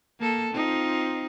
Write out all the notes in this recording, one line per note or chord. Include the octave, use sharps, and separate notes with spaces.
A#3 A4
C4 D#4 F4